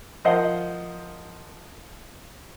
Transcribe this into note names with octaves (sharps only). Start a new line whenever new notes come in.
F3 A#4 C5 D#5 F5 F#5